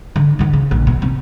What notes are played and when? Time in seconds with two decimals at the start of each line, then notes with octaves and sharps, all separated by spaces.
0.16 D3
0.39 D3 D#3
0.53 C#3
0.71 A#1
0.87 B2
1.02 C3